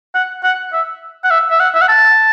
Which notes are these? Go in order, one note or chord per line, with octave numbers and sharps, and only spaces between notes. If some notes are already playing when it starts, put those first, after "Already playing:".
F#5
F#5
E5
F#5
E5
E5
F#5
E5
F#5
A5